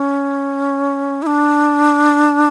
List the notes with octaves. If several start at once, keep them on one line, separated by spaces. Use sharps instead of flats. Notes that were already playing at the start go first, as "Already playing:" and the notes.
Already playing: C#4
E4
D4